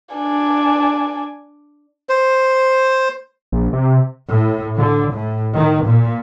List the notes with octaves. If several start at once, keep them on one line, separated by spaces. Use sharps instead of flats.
D4 G#5
C5
A#1
C3
A2
D3
A2
D#3
A#2